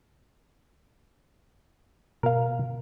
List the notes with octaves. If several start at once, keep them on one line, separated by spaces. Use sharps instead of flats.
B2 A#4 F5